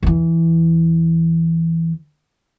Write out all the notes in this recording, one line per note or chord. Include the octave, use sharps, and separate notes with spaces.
E2 E3